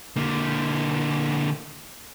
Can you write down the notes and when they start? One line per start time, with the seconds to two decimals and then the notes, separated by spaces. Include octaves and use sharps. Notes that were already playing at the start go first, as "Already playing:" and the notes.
0.16 D3 A#3